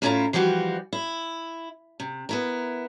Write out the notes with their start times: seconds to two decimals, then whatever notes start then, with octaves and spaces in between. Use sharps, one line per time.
0.02 A2 A#3 C#4 E4 F4 A#5
0.33 E3 F3 G3 F#4 G4
0.93 E4
2.00 C3
2.29 B3 E4 A#4